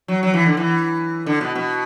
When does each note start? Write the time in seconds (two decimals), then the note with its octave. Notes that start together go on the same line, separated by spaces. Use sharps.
0.08 F#3
0.23 F#3
0.34 E3
0.46 D3
0.57 E3
1.26 D3
1.41 B2
1.56 B2